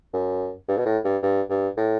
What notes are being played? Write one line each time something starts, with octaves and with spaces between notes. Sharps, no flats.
F#2
G2
B2
A2
G2
G2
G2
A2